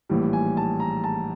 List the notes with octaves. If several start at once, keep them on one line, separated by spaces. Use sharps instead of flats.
A#1 A2 E3 G3
G#5
A5
A#5
A5